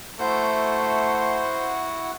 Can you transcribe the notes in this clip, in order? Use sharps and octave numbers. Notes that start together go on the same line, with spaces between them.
A3 E4 F#4 C5 F#5